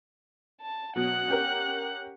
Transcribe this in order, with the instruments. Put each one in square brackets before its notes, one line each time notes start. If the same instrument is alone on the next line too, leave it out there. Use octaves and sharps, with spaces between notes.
[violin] A5
[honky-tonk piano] B2 F#3 [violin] F#5 F#6
[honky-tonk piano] C#4 G4 A#4